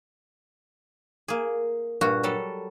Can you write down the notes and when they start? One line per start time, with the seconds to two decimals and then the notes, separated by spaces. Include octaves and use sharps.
1.28 A#3 G#4
2.01 G2 A#2 F#4
2.23 F#3 G3 A4